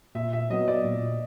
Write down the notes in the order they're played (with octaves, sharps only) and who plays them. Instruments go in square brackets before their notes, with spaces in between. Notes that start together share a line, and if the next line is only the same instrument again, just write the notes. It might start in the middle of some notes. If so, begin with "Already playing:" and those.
[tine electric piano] A#2 [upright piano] E5
[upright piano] E5
[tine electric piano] F#3 B3 [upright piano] D#5
[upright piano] D5
[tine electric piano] A#2